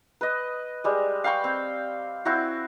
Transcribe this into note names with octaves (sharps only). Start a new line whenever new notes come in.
B4 D#5
G3 G#3
F5 G5 B5 C#6
C4
C4 E4 F#4